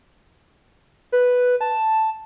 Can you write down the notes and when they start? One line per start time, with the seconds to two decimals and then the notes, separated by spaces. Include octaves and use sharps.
1.12 B4
1.61 A5